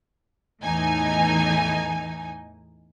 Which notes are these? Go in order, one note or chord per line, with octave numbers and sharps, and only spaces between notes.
E2 A2 E3 D#4 G#5